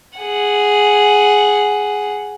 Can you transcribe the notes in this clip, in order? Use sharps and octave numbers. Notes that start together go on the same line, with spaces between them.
G#4 F#5